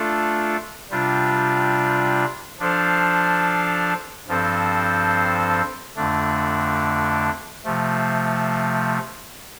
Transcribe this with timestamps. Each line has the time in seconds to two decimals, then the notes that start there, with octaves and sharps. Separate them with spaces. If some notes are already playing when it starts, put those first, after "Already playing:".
Already playing: A3 D4 F4 A4
0.91 C3 G3 D4 F4
2.59 F3 D4 A4 C5 F5
4.28 G2 F3 C4 A4 C5
5.96 F2 D3 A3 D4
7.64 C3 F3 A3